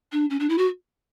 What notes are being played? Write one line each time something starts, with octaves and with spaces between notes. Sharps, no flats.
D4
C#4
D4
E4
F#4